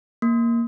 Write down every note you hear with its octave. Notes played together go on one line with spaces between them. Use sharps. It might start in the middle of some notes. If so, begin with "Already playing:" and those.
A#3